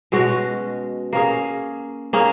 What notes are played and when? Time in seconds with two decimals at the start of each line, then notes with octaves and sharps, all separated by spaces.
0.12 B2 G#3 C#4 F#4
1.13 A#3 C#4 G#4
2.13 A#3 C#4 G#4